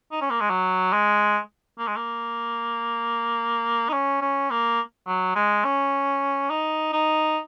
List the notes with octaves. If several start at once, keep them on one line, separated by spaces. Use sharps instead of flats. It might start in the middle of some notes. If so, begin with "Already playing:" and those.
D#4
C#4
A#3
G#3
F#3
G#3
A#3
G#3
A#3
D#4
C#4
C#4
A#3
F#3
G#3
C#4
D#4
D#4